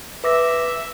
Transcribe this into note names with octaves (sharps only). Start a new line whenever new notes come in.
B4 E5 D6 A#6